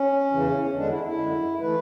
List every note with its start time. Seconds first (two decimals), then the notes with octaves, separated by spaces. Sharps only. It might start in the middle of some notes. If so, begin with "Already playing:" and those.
Already playing: C#4
0.33 E2 C#3 E3
0.75 E2 D3 G#3 D4
0.89 E4
1.03 E4
1.18 F#2 D3 G#3
1.60 E3 A3 B4